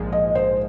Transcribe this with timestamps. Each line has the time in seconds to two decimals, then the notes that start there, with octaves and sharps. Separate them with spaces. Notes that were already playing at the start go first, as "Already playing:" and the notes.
Already playing: A#1 G#2 F3 G#3
0.12 D#5
0.35 C5